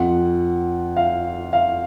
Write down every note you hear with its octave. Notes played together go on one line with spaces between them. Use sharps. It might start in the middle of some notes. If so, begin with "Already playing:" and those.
Already playing: F2 F3 F#5
F5
F5